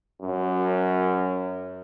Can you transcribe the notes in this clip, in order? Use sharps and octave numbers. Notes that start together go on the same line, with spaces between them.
F#2